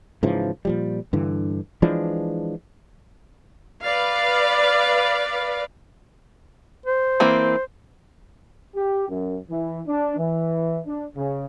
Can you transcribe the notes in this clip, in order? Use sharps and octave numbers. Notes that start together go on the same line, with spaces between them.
G#2 C#3 E3 F3
A#2 F3 G3
G2 D3 E3
E3 F3 G#3 D4
B4 D5 F5
C5
E3 A#3 C4
G4
F#2
E3
D4
E3
D4
C#3